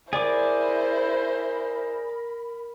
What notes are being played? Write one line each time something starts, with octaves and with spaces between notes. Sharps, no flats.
E4 G#4 A#4 C5 D5 B5 D6